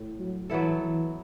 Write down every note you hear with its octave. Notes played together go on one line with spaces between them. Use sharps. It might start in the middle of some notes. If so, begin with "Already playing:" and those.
Already playing: A2
F#3
E3 F#3 B3 E4 A4
E3